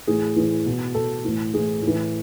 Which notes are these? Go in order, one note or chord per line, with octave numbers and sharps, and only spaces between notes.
A2 E3 G#4
A2 E3
B2
B2 A4
A2 E3
A2 E3 G#4
A2
E3